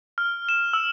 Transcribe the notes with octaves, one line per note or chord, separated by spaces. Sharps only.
F6
E7
E6